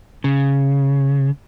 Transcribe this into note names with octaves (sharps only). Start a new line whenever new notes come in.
C#3